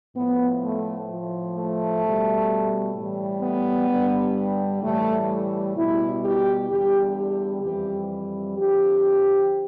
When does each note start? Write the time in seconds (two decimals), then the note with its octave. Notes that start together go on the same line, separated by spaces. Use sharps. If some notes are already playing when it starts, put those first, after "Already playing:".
0.15 A2 F3 B3
0.62 A3
1.09 A2 F3
1.56 A3
2.03 B2 G3
2.96 A2 E3 G3
3.42 B3
3.89 G2 D3 G3
4.83 A2 E3 G3 A3
5.77 B2 G3 E4
6.24 G4
6.70 E2 D3 G3 G4
7.17 G4
7.63 F2 E3 G3 G4
8.57 F2 D3 F3 G4